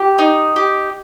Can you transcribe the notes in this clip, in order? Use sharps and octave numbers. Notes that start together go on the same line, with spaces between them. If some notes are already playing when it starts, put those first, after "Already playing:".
Already playing: G4
D#4
G4